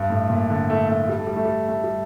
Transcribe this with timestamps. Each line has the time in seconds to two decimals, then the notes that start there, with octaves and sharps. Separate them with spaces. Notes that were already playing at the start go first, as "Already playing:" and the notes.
Already playing: G2
0.10 A2
0.30 A#2
0.50 D3
0.70 A3
0.89 A3
1.09 G3
1.19 A3
1.27 G3
1.36 A3
1.45 G3
1.68 A3
1.84 G3